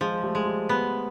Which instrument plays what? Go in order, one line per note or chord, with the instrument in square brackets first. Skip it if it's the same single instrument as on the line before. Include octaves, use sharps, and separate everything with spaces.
[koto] F3 [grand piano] G#3
[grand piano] G3 A3
[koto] G#3
[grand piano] G3
[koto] B3